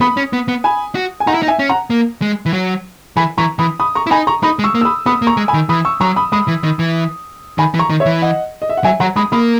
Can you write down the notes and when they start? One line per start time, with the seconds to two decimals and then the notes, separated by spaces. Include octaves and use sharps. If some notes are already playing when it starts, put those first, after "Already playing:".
0.01 B3 B5 D#6
0.17 C#4
0.33 B3
0.48 B3
0.64 G#5 B5
0.95 F#4
1.20 G#5
1.27 D#4 F#5 A#5
1.34 E4
1.42 D#4
1.48 E5 G#5
1.59 C#4
1.69 F#5 A#5
1.90 A#3
2.22 G#3
2.46 E3
2.53 F#3
3.17 E3 G#5 B5
3.38 E3 A#5 C#6
3.59 E3 B5 D#6
3.80 B5 D#6
3.95 A#5 C#6
4.07 E4
4.11 D#4 G#5 B5
4.27 A#5 C#6
4.43 D#4 B5 D#6
4.59 G#3
4.64 C#6 E6
4.75 A#3
4.81 E6
4.85 B5 D#6
5.06 B3 B5 D#6
5.22 A#3
5.27 A#5 C#6
5.37 G#3
5.48 G#5 B5
5.54 D#3
5.69 E3 B5 D#6
5.85 C#6 E6
6.01 F#3 A#5 C#6
6.16 B5 D#6
6.32 G#3 B5 D#6
6.48 E3
6.64 D#3
6.79 E3
7.58 D#3 G#5 B5
7.74 E3
7.79 A#5 C#6
7.90 D#3
8.00 C#5 E5
8.06 E3
8.22 D#5 F#5
8.62 D#5
8.69 E5
8.77 F#5
8.84 F#3 E5 G#5
9.00 F#3 F#5 A#5
9.16 G#3 B5 D#6
9.32 A#3 B5 D#6